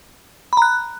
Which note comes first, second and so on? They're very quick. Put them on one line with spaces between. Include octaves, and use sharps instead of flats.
B5 A#5 F#6